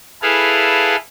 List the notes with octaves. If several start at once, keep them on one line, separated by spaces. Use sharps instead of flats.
E4 G#4 A4 B4 F5